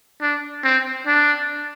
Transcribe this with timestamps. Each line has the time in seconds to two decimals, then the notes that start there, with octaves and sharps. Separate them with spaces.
0.21 D4
0.64 C4
1.07 D4